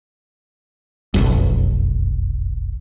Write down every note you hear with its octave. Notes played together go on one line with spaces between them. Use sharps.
F1 B1 F#2